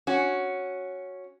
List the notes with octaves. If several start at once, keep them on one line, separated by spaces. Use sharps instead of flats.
C#4 F#4